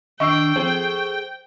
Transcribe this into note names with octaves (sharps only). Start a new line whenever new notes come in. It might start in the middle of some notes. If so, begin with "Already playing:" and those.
D#3 D4 D#5 G5 C#6 E6 C7
F3 C4 G#4 A4 C5